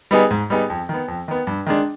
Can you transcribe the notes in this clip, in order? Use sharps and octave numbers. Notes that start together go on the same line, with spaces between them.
G3 B3 D#4 G#4
G#2
G3 B3 D#4 G#4
F2
D#3 B3
F2
D#3 B3
G2
D#3 G#3 D4